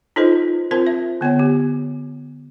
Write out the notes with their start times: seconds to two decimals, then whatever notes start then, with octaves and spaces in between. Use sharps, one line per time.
0.16 D#4 F4 A4 B4 C5 D#5
0.71 C4 F4 A#4 C5 A5
0.87 E5
1.21 D3 B3 C#5 G#5
1.39 G4